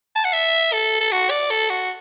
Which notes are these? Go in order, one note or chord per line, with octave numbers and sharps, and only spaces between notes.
A5
F#5
E5
A4
A4
F#4
D5
A4
F#4